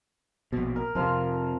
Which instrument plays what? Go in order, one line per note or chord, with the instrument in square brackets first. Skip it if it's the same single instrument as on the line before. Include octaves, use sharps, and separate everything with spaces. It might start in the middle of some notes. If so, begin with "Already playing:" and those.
[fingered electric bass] A#1 B2
[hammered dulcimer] A#4
[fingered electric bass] F2 C3 [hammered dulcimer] F3 F5 C6